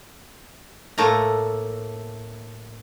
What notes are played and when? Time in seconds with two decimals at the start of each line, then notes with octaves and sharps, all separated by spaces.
0.98 A2 A3 A#3 A#5